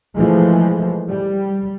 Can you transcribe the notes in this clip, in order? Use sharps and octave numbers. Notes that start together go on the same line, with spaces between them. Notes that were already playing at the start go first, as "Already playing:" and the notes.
E3 F3 G#3 A3
G3